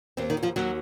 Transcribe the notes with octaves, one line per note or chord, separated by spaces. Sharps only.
D#2 C4
D#3 D#4
D#2
F3 F4
D#2 F#3 F#4